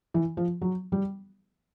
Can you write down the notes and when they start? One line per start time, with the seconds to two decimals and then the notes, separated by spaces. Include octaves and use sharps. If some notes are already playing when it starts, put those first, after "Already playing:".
0.14 E3
0.37 F3
0.62 F#3
0.92 G3